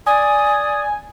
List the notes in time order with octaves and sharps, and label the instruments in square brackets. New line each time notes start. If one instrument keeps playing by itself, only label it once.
[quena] D5 [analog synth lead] G#5 [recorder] D#6